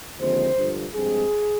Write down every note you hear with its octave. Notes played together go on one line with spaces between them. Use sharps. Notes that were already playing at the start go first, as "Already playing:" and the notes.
D#2 D3 F3 G#3 C4 C5
G2 D3 F3
G2 F3 G#3 C4 G#4